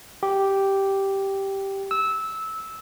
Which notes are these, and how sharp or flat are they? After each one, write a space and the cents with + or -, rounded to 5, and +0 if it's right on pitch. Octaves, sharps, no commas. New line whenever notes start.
G4 -5
E6 -15